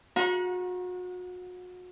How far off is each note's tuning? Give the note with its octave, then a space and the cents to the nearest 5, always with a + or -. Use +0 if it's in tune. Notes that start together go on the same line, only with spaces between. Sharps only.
F#4 -35 F#5 -20 A#5 +30